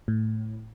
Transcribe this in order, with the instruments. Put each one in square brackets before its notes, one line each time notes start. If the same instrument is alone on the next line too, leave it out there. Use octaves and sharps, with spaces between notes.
[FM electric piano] A2